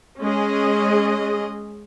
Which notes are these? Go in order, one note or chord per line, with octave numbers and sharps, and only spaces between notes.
G#3 C#4 G#4 D#5